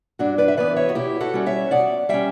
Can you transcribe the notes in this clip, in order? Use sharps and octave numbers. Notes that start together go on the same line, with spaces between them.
G2 D4 F#4
B4 D5
E5
E3 B3 B4 D5
C#5 E5
F#4
B2 E4 G4
F#4 A4
G3 C#4
C#5 E5
B2 D5 F#5
G3 C#4 E5 G5